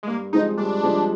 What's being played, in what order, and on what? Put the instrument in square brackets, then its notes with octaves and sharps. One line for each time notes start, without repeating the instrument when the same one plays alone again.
[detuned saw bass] G#3
[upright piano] G2 [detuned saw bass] A#3
[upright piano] F3 G#3 C4 [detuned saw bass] D#4
[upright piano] G2 [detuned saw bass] D4
[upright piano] F3 G#3 C4